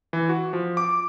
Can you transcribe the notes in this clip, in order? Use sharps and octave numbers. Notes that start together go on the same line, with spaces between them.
E3
F#4
F3
D6